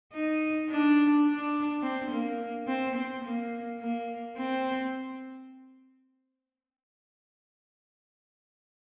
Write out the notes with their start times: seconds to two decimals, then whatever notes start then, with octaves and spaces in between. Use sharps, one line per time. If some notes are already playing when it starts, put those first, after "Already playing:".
0.14 D#4
0.71 D4
1.26 D4
1.82 C4
2.11 A#3
2.68 C4
2.95 C4
3.24 A#3
3.80 A#3
4.37 C4